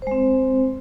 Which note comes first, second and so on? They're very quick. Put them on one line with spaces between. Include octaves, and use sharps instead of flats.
C5 G#3 C4